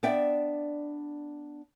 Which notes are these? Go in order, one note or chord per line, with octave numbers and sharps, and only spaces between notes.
B3 D4 D5 E5 G5